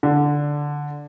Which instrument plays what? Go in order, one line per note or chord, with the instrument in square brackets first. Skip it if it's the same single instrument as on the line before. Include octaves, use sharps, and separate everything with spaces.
[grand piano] D3